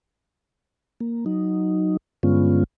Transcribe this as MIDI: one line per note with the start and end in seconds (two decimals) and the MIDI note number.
1.01 1.25 58
1.26 1.97 54
1.26 1.97 63
2.23 2.64 43
2.23 2.64 50
2.23 2.64 56
2.23 2.64 59
2.23 2.64 61
2.23 2.64 65